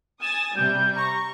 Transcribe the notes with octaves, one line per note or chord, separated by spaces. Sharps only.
G#5 D#6 A6 E7
C3 G3 G6
A#5 C#6